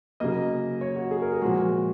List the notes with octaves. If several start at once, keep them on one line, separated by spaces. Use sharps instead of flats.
C#3 F#3 A#3 D#5
C#5
F#4
G#4
A#4
G#4
A#2 F3 G#3 F#4